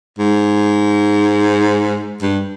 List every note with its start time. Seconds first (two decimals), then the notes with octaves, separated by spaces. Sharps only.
0.18 G#2
2.22 G2